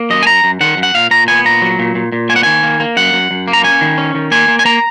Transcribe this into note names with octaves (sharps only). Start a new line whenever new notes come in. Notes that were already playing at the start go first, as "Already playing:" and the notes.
Already playing: A#3
F#2 D#5
G#5
F#2 A#5
F#2
D#3 F#5
F#2
F#5
A#2 F5
A#2 A#5
B3 G#5
A#2 A#5
F#3
A#2
A#2
A#2
A#3 G#5
F#5
D#3 G#5
A#3
A#3
F#2 F#5
F#2
F#2
A#3
A#5
C#4 G#5
D#3
C#4
D#3
A#3 G#5
A#3
G#5
A#3 A#5